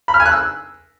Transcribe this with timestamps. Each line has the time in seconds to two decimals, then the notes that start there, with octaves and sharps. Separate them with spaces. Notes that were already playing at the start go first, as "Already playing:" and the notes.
0.08 B5
0.14 F6
0.20 G#5
0.26 F#6
0.31 E6